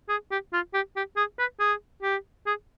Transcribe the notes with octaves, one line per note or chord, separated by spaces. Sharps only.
G#4
G4
F4
G4
G4
G#4
B4
G#4
G4
G#4